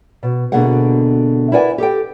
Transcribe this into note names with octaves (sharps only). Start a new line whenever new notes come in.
B2
D2 B2 D3 A#3 G#4 F#5
E4 A#4 B4 D5 F#5 G#5
G4 A4 G5